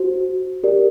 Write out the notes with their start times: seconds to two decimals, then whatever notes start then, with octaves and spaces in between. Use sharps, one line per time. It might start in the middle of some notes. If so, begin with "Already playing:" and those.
Already playing: F#4 C5
0.64 G4 A#4 D5